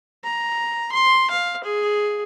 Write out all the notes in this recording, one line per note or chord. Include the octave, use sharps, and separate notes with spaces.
A#5
C6
F5
G#4